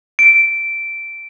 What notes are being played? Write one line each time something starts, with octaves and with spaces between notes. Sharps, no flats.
D7